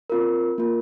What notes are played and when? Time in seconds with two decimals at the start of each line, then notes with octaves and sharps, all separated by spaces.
0.10 C4 F4 A#4
0.58 A#3 F4 A#4